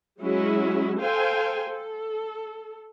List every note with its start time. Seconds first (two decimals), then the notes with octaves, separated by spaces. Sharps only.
0.21 F#3 G#3 C#4 E4 F#4
1.01 A4 C5 F5 G5 G#5
1.70 A4